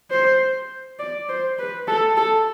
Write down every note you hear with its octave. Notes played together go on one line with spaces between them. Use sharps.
C5
D5
C5
B4
A4
A4